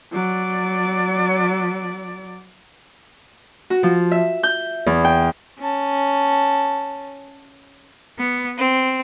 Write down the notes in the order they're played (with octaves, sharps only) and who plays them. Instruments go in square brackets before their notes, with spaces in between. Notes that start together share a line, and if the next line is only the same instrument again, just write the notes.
[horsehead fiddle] F#3 D5
[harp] F#4
F3
E5
G6
E2
G5
[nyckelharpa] C#4 A5
[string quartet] B3
C4